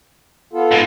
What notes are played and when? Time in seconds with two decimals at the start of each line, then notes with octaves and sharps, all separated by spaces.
0.53 B3 F4 A4
0.72 G#2